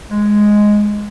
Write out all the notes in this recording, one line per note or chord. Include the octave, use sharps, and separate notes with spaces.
G#3